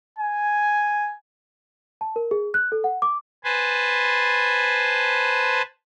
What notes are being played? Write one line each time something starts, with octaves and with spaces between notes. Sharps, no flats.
G#5
A5
A#4
G#4
F#6
A4
F#5
D6
B4 C5 G#5 A5